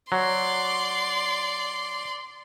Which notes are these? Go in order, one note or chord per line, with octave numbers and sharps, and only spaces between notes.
F#3 D5 C6